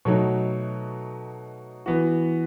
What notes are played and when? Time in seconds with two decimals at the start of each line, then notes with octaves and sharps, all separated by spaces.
0.05 B2 F#3 A3 D#4
1.86 E3 B3 F#4